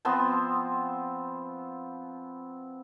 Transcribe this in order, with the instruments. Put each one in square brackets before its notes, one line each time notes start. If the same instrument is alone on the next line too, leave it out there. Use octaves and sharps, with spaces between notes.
[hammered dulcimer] F3 B3 C4 A5